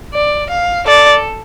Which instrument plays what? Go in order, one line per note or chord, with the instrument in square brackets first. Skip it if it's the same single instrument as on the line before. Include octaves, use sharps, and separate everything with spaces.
[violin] D5
F5
[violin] A4 [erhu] D5